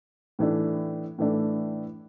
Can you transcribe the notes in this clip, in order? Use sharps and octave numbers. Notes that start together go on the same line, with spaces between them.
A2 E3 A3 D4
A2 E3 A3 D4